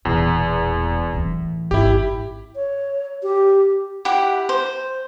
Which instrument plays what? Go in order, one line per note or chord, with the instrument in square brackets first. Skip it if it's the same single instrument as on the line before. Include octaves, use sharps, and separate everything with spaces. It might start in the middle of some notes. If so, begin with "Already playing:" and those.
[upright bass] E1 A#2 [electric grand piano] E2
[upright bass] A2 E3
[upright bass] G#1 [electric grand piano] E4 G4
[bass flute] C#5
G4
[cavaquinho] E4 G4 F#5
C5